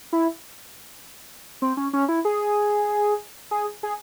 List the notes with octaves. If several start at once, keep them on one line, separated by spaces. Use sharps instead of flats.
E4
C4
C#4
C#4
E4
G#4
G#4
G#4